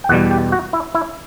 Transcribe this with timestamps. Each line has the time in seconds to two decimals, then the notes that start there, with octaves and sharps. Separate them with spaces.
0.04 G5
0.09 E2 B2 G3 F#5
0.31 G4
0.52 F#4
0.73 E4
0.95 E4